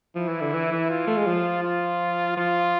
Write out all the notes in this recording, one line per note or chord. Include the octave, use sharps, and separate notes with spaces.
F3 E4
E3
D3
E3
E3
F4
A3
G#3
F3
F4
F3 F4